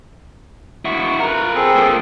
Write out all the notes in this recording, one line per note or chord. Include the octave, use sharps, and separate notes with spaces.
E4 F#4 C#6
A#4 B4
F4
C4 G#4 A4
F3 A#3